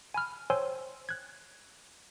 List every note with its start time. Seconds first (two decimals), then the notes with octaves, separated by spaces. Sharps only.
0.14 G#5 B5 F6
0.50 C5 C#5 G5 G#5 C6 E6
1.09 F#6 G#6